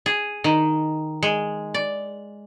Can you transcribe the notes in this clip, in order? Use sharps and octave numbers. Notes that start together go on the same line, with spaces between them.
G#4
D#3
G#3
D5